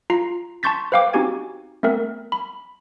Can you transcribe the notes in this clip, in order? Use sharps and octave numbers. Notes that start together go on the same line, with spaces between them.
F4 A#5 C7
A5 C6 C#6 G6 A6 B6
B4 C5 F5 G5 D6
C4 D#4 F#4 G4 G#5 G#6
A3 B3 C4 A#4 E5
B5